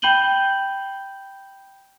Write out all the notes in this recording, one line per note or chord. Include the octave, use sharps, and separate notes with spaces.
G5 B5 G6 D#7 F#7 G7